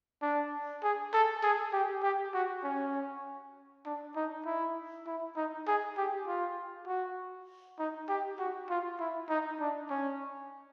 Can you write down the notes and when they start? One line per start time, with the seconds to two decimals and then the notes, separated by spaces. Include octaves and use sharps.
0.22 D4
0.83 G#4
1.13 A4
1.43 G#4
1.73 G4
2.03 G4
2.34 F#4
2.63 C#4
3.85 D4
4.16 D#4
4.46 E4
5.07 E4
5.36 D#4
5.67 G#4
5.97 G4
6.27 F4
6.87 F#4
7.79 D#4
8.08 G4
8.39 F#4
8.69 F4
9.00 E4
9.29 D#4
9.60 D4
9.90 C#4